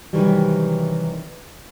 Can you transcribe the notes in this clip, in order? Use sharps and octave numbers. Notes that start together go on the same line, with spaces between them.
C3 D#3 E3 F#3 G3